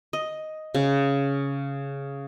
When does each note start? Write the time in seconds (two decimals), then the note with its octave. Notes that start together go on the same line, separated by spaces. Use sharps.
0.13 D#5
0.74 C#3